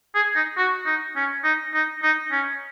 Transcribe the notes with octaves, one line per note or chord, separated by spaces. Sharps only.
G#4
D#4
F#4
D#4
C#4
D#4
D#4
D#4
C#4